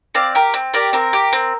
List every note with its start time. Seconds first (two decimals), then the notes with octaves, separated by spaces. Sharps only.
0.15 C4 D5 F5
0.35 G4 A#4
0.54 C4
0.74 G4 A#4 D5
0.93 C4 A#4
1.13 G4
1.33 C4